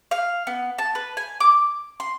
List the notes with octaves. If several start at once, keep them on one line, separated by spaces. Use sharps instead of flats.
F5
B3
A5
B4
G#5
D6
C6